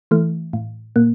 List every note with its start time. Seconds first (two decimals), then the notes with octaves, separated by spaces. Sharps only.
0.11 E3 A3
0.53 A2
0.96 A#2 A#3